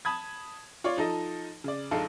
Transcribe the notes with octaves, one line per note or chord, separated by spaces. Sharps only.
A5 B5 D#6 G#6
F4 C#5 D5
F3 D#4 A4 D#5
C#3 D5
A#1 G#3 D#4 A4 F5